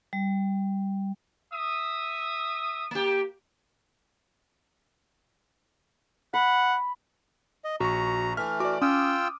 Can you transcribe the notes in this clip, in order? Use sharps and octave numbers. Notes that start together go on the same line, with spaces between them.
G3
E5 D#6
A#3 G4
F#5 B5
D#5
A#1 F#4 A#5 C#6
E3 A3 E5 F6
F#4 D5 D6
C#4 F4 G5 D#6 E6